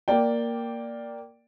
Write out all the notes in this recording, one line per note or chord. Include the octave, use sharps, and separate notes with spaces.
A#3 D5 G5